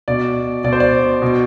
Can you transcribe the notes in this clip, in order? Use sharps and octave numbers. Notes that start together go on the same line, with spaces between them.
B2 D5
B2 D5
C5
D5
B2